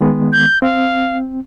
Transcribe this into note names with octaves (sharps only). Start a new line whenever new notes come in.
D#3 G#3 B3
G6
C4 F5